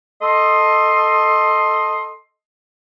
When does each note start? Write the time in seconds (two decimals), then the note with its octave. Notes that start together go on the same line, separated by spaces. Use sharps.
0.22 A4 D#5 C6